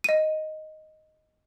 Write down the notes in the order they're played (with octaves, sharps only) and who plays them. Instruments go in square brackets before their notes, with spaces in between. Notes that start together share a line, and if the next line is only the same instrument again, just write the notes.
[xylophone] D#5 D#7